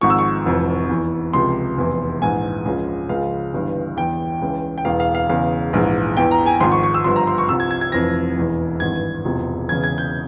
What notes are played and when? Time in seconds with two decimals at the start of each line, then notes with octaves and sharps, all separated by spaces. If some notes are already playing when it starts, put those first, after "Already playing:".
0.01 G#1 G#2 F3 C#6
0.10 E6
0.19 C#6
0.45 F1 F2 E3
0.89 E2 E3
1.33 C#2 C3 F3 C6
1.77 F1 E2 E3
2.21 A#1 G#2 E3 G#5
2.65 C#2 C#3 F3
3.09 C#2 C#3 F3 F5
3.53 G1 G2 E3
3.97 E2 E3 G5
4.41 C#2 C#3 E3
4.78 G5
4.85 E1 E2 E3 F5
5.00 F5
5.15 F5
5.28 E1 E2 C#3 F5
5.73 A#1 G#2 E3
6.17 E2 E3 G5
6.31 A#5
6.46 G#5
6.60 G#1 G#2 F3 C6
6.72 C#6
6.83 C#6
6.94 E6
7.04 G1 G2 F3 C6
7.16 A#5
7.27 C6
7.38 C#6
7.49 C2 C3 F3 E6
7.60 G#6
7.71 G#6
7.81 G#6
7.92 F1 F2 E3 A#6
8.37 E1 E2 E3
8.80 G#1 G2 E3 G#6
9.24 E1 E2 C3 F3
9.68 E1 E2 C#3 E3 G#6
9.84 G#6
9.98 G6